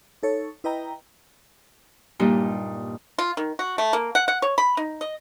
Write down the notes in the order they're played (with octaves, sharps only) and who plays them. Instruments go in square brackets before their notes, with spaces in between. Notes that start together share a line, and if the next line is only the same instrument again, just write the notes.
[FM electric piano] D#4 A4 C#5
E4 B4 D#5 G5 A#5
[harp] G2 A#2 G3 D#4
[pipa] F4
D#3
F#4
A3
A#3
F#5
F#5
C#5
B5
D#4
D#5